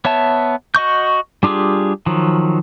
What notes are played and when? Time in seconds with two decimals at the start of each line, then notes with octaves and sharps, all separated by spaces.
0.05 B3 C#5 E5 A5
0.75 F#4 D#5 C#6 G6
1.43 G3 D4 F4 G4 G#4
2.06 D#3 F3 F#3